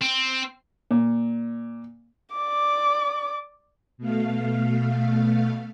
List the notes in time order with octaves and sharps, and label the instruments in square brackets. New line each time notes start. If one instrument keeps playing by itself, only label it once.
[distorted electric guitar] C4
[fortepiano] A#2
[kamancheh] D5 D6
[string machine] B2 A3 F5